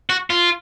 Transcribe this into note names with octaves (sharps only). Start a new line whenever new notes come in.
F#4
F4